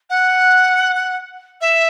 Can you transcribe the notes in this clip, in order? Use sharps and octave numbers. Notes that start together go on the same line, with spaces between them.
F#5
E5